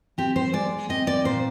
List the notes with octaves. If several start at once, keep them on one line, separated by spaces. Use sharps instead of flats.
C4 G4
C5
G#3 D5
C4 D#5
D5
A#2 C5